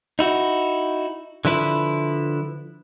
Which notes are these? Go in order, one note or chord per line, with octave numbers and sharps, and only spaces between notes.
D#4 E4 F#4
D3 F3 E4 B4